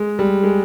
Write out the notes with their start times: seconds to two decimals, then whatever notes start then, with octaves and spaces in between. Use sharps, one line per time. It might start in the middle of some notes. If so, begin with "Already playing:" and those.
Already playing: G#3
0.19 G3
0.44 G#3